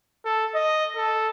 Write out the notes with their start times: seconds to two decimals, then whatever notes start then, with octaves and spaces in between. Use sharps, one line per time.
0.25 A4
0.54 D#5
0.96 A4